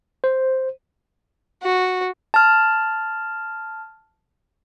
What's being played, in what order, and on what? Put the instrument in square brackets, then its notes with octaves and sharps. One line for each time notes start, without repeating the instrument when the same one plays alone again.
[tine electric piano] C5
[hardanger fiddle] F#4
[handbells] A5 F6